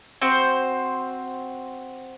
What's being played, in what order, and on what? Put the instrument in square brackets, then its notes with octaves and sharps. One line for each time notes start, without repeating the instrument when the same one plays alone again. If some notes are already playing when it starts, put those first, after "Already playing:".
[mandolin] C4 F#4 C5